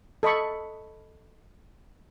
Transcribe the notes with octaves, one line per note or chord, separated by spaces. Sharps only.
A4 D#5 B5 C#6